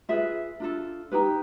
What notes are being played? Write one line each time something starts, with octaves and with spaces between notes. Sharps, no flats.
F4 G#4 B4 E5
D4 F4 A4
D#4 G4 B4